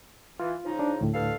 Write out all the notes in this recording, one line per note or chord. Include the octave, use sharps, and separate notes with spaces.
E3 F4
C#3 F3 D#4
D4
D2 A2
G2 A4 F5